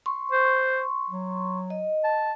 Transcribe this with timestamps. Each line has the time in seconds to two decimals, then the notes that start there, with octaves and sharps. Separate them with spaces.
0.06 C6 C#6
0.32 C5
1.10 F#3
1.70 D#5
2.04 A5